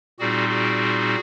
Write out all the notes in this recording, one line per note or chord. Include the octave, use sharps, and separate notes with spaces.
A#2 G3 C4 D#4 F#4 G#4
F#4 G#4